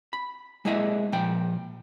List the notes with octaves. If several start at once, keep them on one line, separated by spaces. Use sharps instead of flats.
B5
G#3 A#3 E4 G#4 D#5 E5
A#2 F3 G5